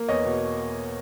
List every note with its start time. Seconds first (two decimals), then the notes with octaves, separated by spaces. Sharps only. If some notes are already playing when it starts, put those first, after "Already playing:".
Already playing: A#3
0.08 E2 C#5 D#5
0.25 B2